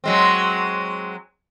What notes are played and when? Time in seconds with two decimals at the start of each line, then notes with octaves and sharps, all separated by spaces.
0.04 F#3 G#3 C4